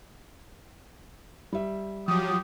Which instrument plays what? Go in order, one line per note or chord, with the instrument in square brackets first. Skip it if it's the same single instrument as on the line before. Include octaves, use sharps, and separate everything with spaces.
[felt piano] G3 E5
[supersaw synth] F3 F#3 [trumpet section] G4 D#6